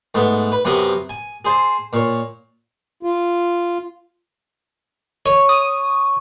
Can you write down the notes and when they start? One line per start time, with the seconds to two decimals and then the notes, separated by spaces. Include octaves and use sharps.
0.15 G#2 A3 B3
0.52 B4
0.65 F#2 C3 B3 A#5 D#6
1.09 G#5
1.45 G#4 C5 G#5 A5
1.93 A#2 C#5
3.03 F4
5.26 C#5 C#6
5.49 D#6